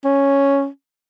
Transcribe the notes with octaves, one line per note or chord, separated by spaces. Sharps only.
C#4